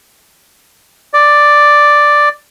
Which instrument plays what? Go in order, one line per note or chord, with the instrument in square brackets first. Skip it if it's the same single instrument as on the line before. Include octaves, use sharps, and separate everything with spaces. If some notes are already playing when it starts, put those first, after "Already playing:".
[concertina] D5